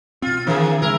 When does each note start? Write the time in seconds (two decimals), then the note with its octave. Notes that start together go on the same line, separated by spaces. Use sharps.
0.22 B2 C4 F4
0.47 D#3 E3 A#3 C4 D4 G#4
0.82 C#3 E3 G#3 E4 A#4